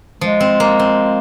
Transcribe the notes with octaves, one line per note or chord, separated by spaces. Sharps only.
F3 G#3
C4
A#3
C4